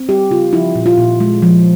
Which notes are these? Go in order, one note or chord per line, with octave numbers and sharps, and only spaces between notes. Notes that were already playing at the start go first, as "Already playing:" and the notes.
Already playing: C4
G3 G4
C#3 F4
F3 E4
A#2
F4
A#2
G#3
F3